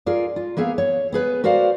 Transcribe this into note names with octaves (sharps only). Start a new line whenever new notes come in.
F4 G#4 A#4 D5
F4
A#3 B3 G#4 E5 F5
C#5
B3 G#4 B4
F#4 A#4 C5 D5 F5